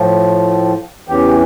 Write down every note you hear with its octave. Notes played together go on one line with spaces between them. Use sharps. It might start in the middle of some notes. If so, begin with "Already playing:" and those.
Already playing: A2 F3
E2 C#3 E3 G4